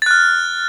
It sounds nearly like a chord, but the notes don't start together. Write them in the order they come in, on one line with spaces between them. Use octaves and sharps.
A6 F#6 F6